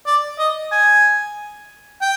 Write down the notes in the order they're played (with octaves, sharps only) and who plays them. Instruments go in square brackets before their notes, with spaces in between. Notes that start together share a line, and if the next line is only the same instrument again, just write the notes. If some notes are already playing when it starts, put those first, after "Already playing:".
[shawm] D5
D#5
G#5
G5